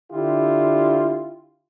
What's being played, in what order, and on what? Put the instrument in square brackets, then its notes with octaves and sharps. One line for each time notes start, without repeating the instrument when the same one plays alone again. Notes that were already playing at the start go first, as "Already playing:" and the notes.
[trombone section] D3 E4 F4 G4